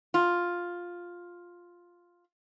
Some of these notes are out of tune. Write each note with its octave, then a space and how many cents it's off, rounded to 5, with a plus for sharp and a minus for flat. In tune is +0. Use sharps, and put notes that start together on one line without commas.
F4 +5